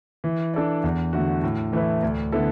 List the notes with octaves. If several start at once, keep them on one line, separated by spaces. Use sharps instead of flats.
E3
D4 A4 D5
E2
D3 A3 F#4
A2
E3 A3 E4 B4
D2
D3 B3 E4 A4